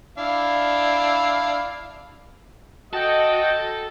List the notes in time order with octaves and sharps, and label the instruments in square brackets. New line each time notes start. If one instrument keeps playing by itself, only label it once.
[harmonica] D4 E4 F5
[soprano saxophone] F#4 [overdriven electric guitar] A4 [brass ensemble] D#5 [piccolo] G5